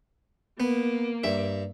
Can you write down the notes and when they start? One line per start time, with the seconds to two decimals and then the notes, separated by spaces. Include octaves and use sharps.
0.60 A#3 B3
1.24 G2 E5